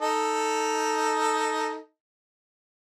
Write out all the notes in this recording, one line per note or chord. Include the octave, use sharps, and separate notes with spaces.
D#4 A4